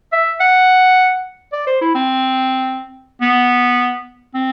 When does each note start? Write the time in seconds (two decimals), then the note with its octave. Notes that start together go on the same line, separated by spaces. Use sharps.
0.13 E5
0.40 F#5
1.53 D5
1.67 C5
1.81 E4
1.95 C4
3.22 B3
4.35 C4